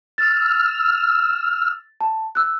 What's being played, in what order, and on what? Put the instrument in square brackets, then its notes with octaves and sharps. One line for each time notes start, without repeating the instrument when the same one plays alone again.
[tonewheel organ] E6 F6 [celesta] A6
[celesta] A5
E6 F#6